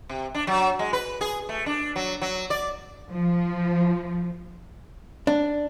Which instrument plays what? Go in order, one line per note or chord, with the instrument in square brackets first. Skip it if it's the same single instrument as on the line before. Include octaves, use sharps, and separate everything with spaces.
[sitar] C3
D4
F#3
G#3
B4
G#4
A3
D4
F#3
F#3
D5
[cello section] F3
[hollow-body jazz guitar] D4